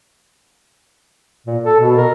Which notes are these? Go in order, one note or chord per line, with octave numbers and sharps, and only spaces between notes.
A#2
A4
B2
A#4